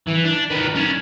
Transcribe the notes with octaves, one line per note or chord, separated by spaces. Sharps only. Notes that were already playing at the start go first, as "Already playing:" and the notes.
E3
D4
D#3 B4
C#4 D4